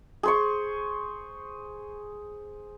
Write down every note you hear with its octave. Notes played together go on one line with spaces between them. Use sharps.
G#4 C5 C#6